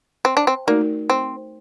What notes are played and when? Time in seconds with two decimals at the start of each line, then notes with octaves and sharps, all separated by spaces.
0.25 C4
0.37 D4
0.47 C4
0.67 A3 A#3 D#4 F#4 A#4 D5
1.10 C4